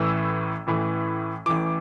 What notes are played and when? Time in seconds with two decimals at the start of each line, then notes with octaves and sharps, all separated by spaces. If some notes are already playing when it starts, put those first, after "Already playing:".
Already playing: A1 A2 E3 E6
0.67 A1 A2 E3
1.46 A1 A2 E3 D6